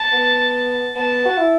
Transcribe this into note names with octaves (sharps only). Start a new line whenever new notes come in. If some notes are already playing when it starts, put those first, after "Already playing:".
Already playing: A5
B3
B3 A5
F#4
E4